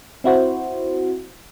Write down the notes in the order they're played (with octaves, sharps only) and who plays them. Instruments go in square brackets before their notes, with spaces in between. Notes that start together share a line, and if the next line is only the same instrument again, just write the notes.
[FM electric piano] C4 E4 F#4 C5